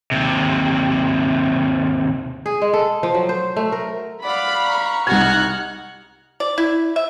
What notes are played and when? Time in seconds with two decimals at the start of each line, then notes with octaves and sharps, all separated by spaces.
0.11 D#2 C3
2.46 G#4
2.62 G#3
2.73 A4
3.03 F3
3.14 F#3
3.29 C5
3.56 A3
3.72 A#4
4.24 D5 F5 F#5 B5
4.64 A#5 C#6
5.07 C2 D#4 F#4 F#5 C#6 F6 F#6 G#6
6.40 D5
6.58 E4
6.96 E5